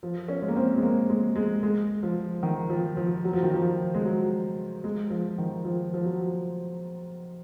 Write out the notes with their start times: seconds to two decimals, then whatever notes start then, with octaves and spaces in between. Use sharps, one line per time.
0.03 F3
0.28 C#4
0.42 G#3
0.48 A#3
0.56 C4
0.77 G#3
0.83 A#3
1.10 G#3
1.36 G#3
1.63 G#3
2.03 F3
2.43 D#3
2.70 F3
2.97 F3
3.24 F#3
3.33 F3
3.43 D#3
3.54 F3
3.95 G#3
4.04 F#3
4.84 G#3
5.10 F3
5.38 D#3
5.65 F3
5.94 F3
6.05 F#3